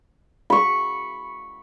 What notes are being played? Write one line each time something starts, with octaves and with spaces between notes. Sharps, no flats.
B5 C#6